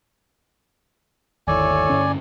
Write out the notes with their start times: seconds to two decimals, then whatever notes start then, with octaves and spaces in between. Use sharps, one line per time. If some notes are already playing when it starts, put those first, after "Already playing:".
1.48 G1 D#2 E4 A4 C#5 D5 G#5
1.90 G2 D3 C#4